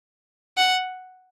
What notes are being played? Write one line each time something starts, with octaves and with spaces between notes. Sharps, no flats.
F#5